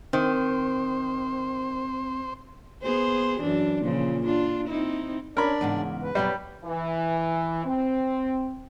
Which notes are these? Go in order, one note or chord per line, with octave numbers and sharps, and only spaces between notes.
D#3 C4 C5
B3 G#4 C5
F#2 E3 D4
A#2 C#3 F3
D4 F4
C4 D#4 E4
C#4 D4 A#4 D5 B5
E2 G#2 C#3
B4
F#2 B2 F#3 G3
E3
C4